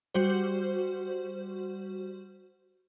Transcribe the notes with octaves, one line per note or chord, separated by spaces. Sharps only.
G3 F#4 C5